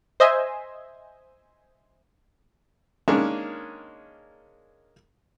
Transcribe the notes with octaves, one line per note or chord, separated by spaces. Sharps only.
C5 D#5 E5 G#5
D#3 G#3 A#3 C#4 D4